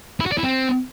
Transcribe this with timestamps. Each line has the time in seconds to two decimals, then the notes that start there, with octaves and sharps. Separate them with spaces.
0.20 E4
0.26 F#4
0.32 D5
0.38 E4
0.44 C4